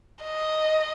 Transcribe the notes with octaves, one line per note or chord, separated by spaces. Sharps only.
D#5